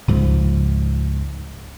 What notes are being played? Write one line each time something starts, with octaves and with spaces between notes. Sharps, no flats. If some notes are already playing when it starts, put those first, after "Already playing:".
C#2 G#2 F3